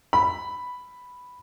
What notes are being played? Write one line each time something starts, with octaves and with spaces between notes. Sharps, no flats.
B5